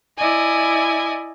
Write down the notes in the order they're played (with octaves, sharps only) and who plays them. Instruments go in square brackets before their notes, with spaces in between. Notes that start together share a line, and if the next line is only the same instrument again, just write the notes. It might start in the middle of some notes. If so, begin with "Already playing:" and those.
[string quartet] E4 D5 D#5 G#5